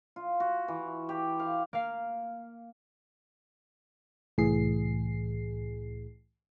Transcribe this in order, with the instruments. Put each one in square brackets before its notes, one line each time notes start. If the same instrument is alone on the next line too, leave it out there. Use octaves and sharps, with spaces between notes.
[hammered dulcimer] F4
F#4
E3
G4
F5
[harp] A#3 F5
[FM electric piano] C2 A2 E3 G#4 C7